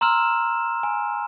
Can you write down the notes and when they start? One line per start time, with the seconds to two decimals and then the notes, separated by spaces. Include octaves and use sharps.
0.01 A#5 C6 E6 F6 E7
0.83 G#5